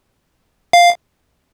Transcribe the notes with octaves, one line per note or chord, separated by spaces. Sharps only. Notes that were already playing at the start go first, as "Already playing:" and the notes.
F5